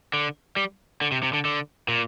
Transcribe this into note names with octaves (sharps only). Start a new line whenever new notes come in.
D3
G3
D3
C3
C3
D3
D3
A#2